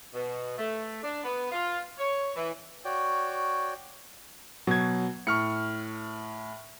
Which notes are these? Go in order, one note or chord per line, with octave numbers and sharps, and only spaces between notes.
B2
A3
D4
B3
F4
C#5
E3
F#4 C#5 D5 G5
B2 F#3 G#6
A2 C#6 F6 C#7